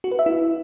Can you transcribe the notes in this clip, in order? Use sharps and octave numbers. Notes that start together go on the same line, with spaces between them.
F#4
B4
E5
E4